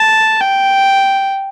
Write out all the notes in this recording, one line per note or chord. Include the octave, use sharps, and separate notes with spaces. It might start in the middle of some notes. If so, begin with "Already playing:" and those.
Already playing: A5
G5